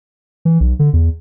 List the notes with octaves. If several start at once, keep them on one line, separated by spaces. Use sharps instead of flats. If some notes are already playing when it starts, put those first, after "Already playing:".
E3
B1
D3
E2